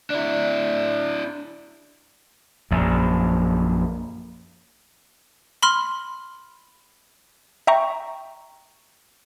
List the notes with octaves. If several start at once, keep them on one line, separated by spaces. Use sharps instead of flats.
D4 E4
A#1 F#2
B5 C6 F6
E5 G5 A#5 C#6